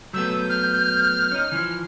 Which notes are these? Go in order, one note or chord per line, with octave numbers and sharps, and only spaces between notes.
F#3 A3 B3 E6 G6
F6
C#4 D#4
E3 F3